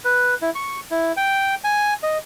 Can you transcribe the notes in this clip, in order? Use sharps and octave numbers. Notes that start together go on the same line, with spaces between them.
B4
E4
C#6
E4
G5
G#5
D#5